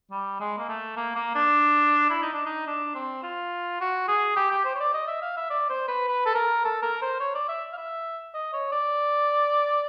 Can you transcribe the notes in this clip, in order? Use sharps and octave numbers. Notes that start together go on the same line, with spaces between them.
G3
G#3
A#3
A3
A#3
A#3
D4
E4
D#4
D4
D#4
D4
C4
F4
F#4
G#4
G4
G4
C5
C#5
D5
D#5
E5
F5
E5
D5
C5
B4
B4
A4
A#4
A4
A#4
C5
C#5
D5
E5
F5
E5
D#5
C#5
D5